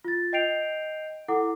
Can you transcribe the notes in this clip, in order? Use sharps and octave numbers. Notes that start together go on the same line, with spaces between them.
F4 A6
D#5 G5 G6 C7 D7 F7
E4 A4 F#5 D6